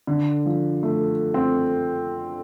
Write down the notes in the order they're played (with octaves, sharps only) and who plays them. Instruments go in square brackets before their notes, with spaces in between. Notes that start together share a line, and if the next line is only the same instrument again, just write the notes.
[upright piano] D3
F3
A3
C4